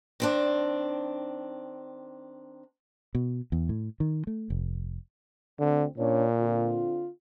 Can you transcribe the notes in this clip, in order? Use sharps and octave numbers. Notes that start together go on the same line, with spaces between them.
D#3 C4 D4
B2
E2
A2
D#3
A3
F1
D2 D3 C4
A#2 C#4 D4 C#5
D3 C4 F4